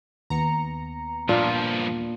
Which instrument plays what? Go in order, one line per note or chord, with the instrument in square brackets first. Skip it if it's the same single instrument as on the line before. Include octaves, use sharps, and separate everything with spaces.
[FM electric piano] D#2 B3 C#7 [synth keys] A#5
[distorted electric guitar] G2 F3 [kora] A#2 D4 F4